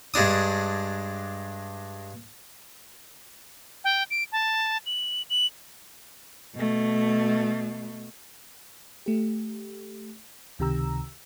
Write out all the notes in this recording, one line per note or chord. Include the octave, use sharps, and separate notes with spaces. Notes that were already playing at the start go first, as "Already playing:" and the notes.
G2 G#3 D4 D#6
G5
D7
A5
F#7
F#7
B2 A3
A3 G4
C#2 C3 D#3 G4 A#5 E6